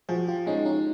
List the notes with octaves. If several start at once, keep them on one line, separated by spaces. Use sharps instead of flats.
F3 F#4 G#4
F4 G4
G#3 C#4 D#4
C#4 D#4